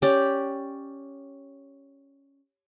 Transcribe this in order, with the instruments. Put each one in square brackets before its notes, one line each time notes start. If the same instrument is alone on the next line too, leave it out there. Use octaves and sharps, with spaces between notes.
[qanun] C#4 G4 D5